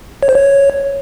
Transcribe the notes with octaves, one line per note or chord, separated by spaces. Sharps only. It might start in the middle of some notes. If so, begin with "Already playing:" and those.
C#5
C5
C#5